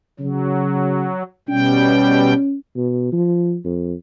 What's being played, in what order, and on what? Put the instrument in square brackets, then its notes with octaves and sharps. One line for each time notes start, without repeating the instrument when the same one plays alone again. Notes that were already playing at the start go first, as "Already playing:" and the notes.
[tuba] C#3 [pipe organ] F#3
[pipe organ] B2 G3 G5 [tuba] C#4
[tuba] B2
F3
F2